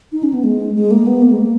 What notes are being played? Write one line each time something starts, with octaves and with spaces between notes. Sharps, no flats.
D#4
C#4
B3
G#3
G#3
A#3
B3
A#3
G#3
A#3